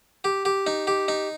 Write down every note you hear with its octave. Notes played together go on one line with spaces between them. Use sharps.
G4
G4
D#4
G4
D#4